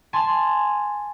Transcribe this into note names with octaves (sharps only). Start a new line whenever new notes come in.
G#5 A5 C6